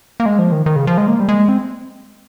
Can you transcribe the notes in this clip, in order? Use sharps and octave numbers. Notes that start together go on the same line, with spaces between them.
A#3
G#3
F3
D#3
D#3
C#3
F3
G#3
A#3
G3
G#3
C4